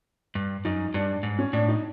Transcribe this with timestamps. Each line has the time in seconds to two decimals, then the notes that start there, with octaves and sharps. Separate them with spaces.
0.35 G2
0.65 F#2 D#4
0.94 G2 D4
1.23 G#2
1.39 C#4
1.53 A2 D4
1.68 D#4